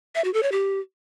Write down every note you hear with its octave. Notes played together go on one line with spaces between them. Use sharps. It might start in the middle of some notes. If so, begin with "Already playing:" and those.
E5
F#4
A4
C#5
G4